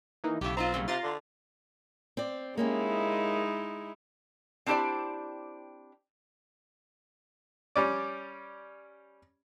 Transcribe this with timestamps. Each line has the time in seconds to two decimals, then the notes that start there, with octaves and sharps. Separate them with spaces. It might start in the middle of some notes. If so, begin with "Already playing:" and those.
0.24 E3 A#3 D#4
0.41 B1 A2 C#3 G4 E5
0.57 C4 F4 D#5 A#5
0.74 A#2 C#3 G3
0.88 C3 F4 A#5 C6 A6
1.03 D3
2.17 C4 D5
2.57 G#3 A#3 C#4 D#4 E4 G4
4.66 C4 D4 E4 G4 C5 D5
7.76 G3 C#4 D5